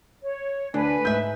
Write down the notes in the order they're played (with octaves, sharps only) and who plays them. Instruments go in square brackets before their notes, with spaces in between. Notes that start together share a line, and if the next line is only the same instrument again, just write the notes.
[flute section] C#5
[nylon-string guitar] D2 [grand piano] D4 [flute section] B4 G#5
[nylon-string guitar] G#2 E5 [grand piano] G6